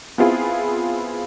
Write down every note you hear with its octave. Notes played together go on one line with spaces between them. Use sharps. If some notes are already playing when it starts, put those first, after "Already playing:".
B3 C4 E4 F4 G#4